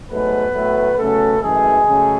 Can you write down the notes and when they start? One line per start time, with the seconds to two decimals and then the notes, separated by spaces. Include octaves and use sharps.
0.11 G#2 F#3 A3 B3 B4
0.55 A2 F#3 A3
0.98 C#3 F#3 A3 B3 A4
1.42 F#2 E3 G#3 A3 G#4
1.86 C#3 F#3 A3